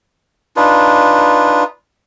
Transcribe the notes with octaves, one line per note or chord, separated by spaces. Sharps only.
D4 D#4 F4 B4